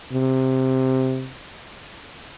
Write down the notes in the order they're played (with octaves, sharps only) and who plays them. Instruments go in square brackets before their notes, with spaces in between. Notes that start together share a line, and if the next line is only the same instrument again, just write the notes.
[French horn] C3